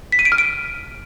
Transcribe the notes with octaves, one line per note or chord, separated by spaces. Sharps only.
B6
D#7
D7
F6
D7